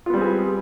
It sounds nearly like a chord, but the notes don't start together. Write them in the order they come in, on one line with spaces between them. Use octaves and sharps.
F4 B3 G3 C4 G#4